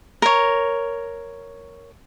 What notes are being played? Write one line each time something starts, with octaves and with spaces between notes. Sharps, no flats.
A#4 C#5